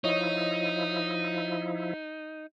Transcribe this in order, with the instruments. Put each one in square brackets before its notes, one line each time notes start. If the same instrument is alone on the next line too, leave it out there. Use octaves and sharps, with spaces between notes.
[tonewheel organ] F3 E4 [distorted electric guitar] D#4 [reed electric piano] C#5 D#5